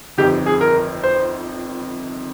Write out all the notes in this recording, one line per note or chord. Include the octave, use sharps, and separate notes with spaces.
G1 F2 D#3 G4
G#4
A#4
C5